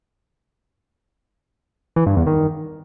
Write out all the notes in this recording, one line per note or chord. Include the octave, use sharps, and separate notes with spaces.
E3
G2
E2
D#3